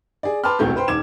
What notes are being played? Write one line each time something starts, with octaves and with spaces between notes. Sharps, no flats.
G#4 D5
B4 A5 B5 C6 D6 F6
D#1 C2 B2 A3 C4 G6
B4 C5 G5 C6
D#1 G#2 D6 G#6 E7